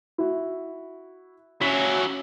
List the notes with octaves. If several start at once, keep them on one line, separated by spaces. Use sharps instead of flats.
E4 F#4
F#3 C#4 E4 B6